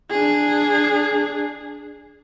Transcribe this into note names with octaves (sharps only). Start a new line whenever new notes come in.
D4 G#4